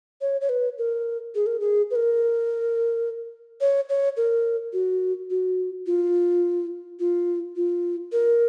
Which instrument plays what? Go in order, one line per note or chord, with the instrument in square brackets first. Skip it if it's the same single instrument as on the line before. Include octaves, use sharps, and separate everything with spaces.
[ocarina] C#5
C#5
B4
A#4
G#4
A#4
G#4
B4
A#4
C#5
C#5
A#4
F#4
F#4
F4
F4
F4
A#4